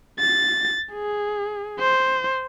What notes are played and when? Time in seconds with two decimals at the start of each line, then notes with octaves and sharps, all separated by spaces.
0.19 A6
0.93 G#4
1.80 C5